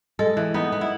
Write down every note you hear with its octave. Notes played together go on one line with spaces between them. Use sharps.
G#3 A4
E3
B3 D#4
B3
E4